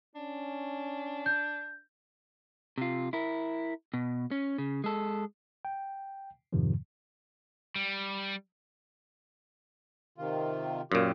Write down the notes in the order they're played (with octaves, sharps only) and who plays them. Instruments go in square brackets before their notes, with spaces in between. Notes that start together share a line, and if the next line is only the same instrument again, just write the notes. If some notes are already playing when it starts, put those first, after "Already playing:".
[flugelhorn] C#4 [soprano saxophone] D4
[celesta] G6
[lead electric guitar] C3 F4
E4 A#4
B2
C#4
C#3
G#3 A4
[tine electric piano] G5
F2 G#2 C3 D#3 F3
[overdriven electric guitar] G3
[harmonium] C3 D#3 F4
[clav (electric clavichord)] F#2 A#2 [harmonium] F4 G4